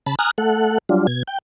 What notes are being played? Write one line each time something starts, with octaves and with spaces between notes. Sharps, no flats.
C#3 A5 B5
G#5 A#5 D#6 F6 F#6
A3 A4 F#5
F#3 G3 D4 F4
B2 G#6
G5